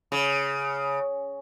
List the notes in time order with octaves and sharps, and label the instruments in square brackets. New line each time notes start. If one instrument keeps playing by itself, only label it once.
[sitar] C#3